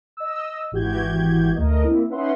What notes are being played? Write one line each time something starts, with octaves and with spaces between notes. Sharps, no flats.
D#5 E6
G#1 E3 F#4 G4 G6 G#6
D2 A3 A#4 D#5
A#3 C4 E4
C#4 D#4 B4 E5 F#5 C6